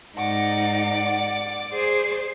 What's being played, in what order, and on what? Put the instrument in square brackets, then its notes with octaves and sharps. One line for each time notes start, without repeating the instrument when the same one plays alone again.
[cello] G#2 D#4 [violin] D5 D6 [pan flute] F#5
[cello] G#4 C5